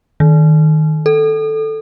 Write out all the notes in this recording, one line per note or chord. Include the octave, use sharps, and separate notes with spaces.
D#3
A4